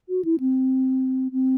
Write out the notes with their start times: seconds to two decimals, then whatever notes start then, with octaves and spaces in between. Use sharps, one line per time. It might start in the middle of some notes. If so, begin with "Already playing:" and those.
0.09 F#4
0.25 E4
0.40 C4
1.32 C4